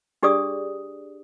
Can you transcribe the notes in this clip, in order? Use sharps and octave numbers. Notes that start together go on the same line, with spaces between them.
D4 G4 G#4 D5 D#6